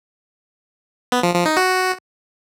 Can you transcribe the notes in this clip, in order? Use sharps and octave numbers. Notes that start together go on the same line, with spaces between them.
B3
F3
F3
D#4
F#4